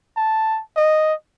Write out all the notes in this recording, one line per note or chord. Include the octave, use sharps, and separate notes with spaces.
A5
D#5